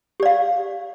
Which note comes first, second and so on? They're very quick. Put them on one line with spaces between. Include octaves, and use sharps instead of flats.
G4 D5 F5